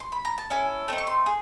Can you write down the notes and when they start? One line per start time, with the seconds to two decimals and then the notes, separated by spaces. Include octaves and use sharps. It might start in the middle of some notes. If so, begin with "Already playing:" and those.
0.00 C6
0.12 B5
0.25 A#5
0.38 A5
0.50 C#4 E4 A4 G#5
0.88 A3 C4 D#4 A5
0.98 C#6
1.07 C6
1.26 G#4